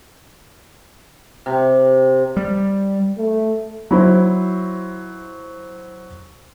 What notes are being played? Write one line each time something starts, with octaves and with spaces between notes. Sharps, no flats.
C3
G3
A3
F#3 E4 C5